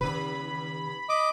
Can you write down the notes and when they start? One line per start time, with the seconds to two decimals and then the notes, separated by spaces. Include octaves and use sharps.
0.01 D#2 C#3 B4 B5
1.09 D#5 D6